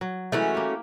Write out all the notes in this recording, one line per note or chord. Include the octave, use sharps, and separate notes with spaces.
F#3
E3 G#3 A3 C#4 F#4 A#4
A#3 G4